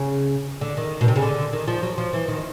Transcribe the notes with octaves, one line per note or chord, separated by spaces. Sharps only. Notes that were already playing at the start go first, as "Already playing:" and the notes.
Already playing: C#3
D3
D#3
B2
C3
C#3
D3
D#3
F3
F#3
F3
E3
D#3